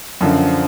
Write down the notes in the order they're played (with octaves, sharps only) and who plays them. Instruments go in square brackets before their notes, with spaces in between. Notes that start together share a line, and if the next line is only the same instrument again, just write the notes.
[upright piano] F#2 D3 F3